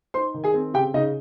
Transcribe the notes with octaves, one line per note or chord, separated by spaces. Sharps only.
D#4 C5 C6
D#3
G#4 G#5
C4
C#3 G4 G5
C#3 D#4 D#5